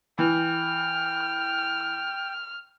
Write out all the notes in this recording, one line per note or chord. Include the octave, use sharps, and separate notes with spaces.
E3 G5 F6